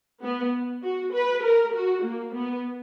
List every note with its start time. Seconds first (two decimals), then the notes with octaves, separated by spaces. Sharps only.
0.23 B3
0.82 F#4
1.14 B4
1.43 A#4
1.74 F#4
2.04 A#3
2.34 B3